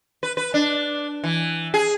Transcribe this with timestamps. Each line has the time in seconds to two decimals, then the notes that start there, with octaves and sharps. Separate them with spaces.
0.23 B4
0.37 B4
0.54 D4
1.24 E3
1.74 G#4